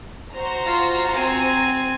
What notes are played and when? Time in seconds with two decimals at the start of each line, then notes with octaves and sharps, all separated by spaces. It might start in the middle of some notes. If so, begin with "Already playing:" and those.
0.34 F#4 C5 A#5
0.66 F4
1.14 C4 G#5